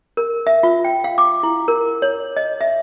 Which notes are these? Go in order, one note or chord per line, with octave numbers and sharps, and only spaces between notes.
A#4
E5
F4
G5
F5
D6
E4
A#4
C#5
D#5
E5